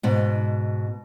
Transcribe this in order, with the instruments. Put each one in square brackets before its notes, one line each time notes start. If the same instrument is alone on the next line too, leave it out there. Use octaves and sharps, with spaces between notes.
[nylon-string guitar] G#2 B2